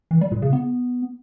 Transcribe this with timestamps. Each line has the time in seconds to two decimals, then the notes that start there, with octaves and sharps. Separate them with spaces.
0.11 E3
0.21 G3
0.32 A#2
0.42 C#3
0.53 B3